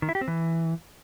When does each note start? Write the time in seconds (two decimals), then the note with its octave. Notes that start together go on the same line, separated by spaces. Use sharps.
0.02 D#3
0.09 E4
0.15 G4
0.21 C4
0.28 E3